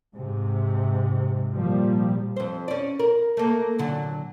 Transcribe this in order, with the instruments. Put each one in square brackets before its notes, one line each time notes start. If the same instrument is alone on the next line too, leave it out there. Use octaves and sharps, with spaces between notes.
[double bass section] G#2 C3
A#2 F3 G3
[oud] F2 C5
C#4 D5
A#4
A3 A#3
A#2 D3 F#3